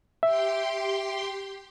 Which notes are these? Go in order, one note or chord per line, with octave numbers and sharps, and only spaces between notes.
G4 E5 G5 C6